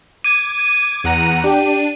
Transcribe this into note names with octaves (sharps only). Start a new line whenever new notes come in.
D6 G#6 D#7
E2 F#5 A#5
D4 G4